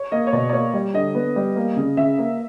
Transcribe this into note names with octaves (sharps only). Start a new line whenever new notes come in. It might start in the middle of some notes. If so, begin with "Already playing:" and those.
Already playing: C#5
A#3 D#5
C#5
B2 D5
D5
A#3 C#5
G3
D3 D#5
B3
G3
A#3
C#3
C#3 E5
A#3